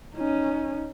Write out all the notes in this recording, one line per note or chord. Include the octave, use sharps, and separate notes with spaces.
C#4 D#4